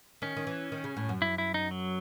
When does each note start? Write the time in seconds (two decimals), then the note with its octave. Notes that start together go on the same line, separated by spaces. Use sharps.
0.22 D#3 C#4
0.36 D#3
0.47 E3
0.72 D#3
0.84 C#3
0.97 A2
1.09 F#2
1.22 E4
1.38 E4
1.54 D#4
1.71 F#3